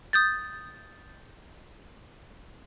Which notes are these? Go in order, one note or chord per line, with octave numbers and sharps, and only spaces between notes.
D#6 G6 A6